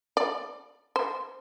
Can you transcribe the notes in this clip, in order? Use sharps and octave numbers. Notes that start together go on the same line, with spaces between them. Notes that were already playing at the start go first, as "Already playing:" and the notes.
D5
C5